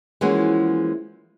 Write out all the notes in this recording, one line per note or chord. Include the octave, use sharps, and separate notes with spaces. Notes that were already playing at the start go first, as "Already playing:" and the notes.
E3 F3 G#3 A#3 C#4 F#4